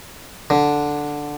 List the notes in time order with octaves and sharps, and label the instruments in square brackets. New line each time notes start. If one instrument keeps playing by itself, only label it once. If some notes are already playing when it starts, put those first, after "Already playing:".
[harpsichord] D3